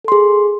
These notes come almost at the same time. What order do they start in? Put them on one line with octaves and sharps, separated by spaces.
A4 C6 G#4